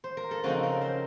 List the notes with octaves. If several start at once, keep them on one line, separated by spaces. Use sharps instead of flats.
C5
A#4
A4
C#3 F3 C4 D#4 F#4
A#4
C5